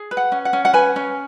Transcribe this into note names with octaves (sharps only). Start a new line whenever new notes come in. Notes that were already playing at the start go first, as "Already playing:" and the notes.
Already playing: G#4
B4
F#5
C#4
F#5
C#4
F#5
B4 G#5
C#4